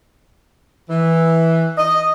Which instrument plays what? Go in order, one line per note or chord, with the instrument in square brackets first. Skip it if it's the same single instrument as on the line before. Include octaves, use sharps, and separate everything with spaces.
[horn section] E3
D#5